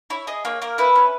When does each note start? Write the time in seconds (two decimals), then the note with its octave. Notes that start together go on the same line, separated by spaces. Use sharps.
0.10 E4 C#5
0.27 G#4 D#5
0.45 A#3 C#5
0.62 A#3 A#4
0.78 E4 B4
0.96 C#4